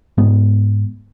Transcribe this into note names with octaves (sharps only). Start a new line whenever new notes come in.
G#2 G#3 B3